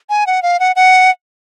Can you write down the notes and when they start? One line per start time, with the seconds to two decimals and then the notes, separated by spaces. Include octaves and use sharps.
0.09 G#5
0.27 F#5
0.43 F5
0.60 F#5
0.76 F#5